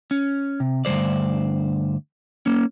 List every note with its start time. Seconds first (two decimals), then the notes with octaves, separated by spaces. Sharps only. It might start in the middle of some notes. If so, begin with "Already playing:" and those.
0.11 C#4
0.60 C3
0.85 D2 G2 E3 C5 D5
2.46 A#3 C#4